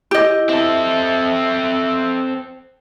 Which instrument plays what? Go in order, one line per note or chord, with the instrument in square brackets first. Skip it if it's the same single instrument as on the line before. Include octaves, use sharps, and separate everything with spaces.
[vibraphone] E4 [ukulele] G4 D#5
[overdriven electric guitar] C4 A4 [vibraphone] E5